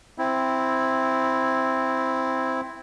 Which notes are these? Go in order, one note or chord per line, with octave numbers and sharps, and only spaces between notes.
C4 E4